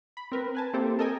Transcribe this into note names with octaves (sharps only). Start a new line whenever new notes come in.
B5
C4 A#4 B4
B4 G#5 A5
A#3 C4 E4 G4 A4 C5
A4 A#4 D#5 G5 G#5